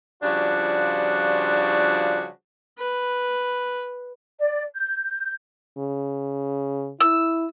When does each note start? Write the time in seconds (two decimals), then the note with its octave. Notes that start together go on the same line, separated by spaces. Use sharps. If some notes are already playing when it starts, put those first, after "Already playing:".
0.23 C#3 F3 G3 D4 F4 F#4
2.79 B4
4.40 D5
4.75 G6
5.78 C#3
7.01 E4 E6